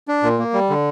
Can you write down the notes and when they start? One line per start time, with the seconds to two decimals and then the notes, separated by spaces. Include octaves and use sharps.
0.08 D4
0.23 A#2
0.39 A#3
0.54 G3
0.70 D3